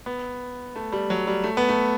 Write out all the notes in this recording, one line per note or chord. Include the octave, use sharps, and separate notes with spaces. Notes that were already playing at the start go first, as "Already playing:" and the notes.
B3
A3
G3
F#3
G3
A3
B3
A3